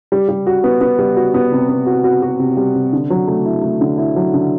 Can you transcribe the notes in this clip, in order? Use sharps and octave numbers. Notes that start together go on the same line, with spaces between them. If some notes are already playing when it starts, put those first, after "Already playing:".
G3
G3
F#4
B3
B3
G3
F#4
B3
C3
B3
F#4
F#4
F#4
C3
G3
C3
D3
F#3
A3
E4
A3
D3
E4
F#3
D3